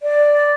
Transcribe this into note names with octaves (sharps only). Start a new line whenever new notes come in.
D5